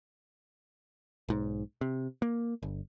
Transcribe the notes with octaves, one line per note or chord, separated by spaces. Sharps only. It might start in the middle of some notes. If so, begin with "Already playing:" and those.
B1 G#2
C3
A#3
G1